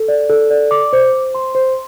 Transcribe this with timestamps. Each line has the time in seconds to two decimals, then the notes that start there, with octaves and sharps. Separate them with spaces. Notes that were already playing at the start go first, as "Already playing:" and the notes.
Already playing: A4
0.08 D5
0.29 A4
0.50 D5
0.71 D6
0.93 C5
1.13 C5
1.35 C6
1.55 C5